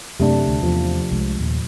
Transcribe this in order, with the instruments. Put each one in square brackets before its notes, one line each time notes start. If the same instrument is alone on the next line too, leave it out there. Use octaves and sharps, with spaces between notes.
[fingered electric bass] F#2 [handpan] C3 A3 D4
[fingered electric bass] D2
[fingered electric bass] E2 [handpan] F3
[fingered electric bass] C2 G3 G#3
D#2 A#2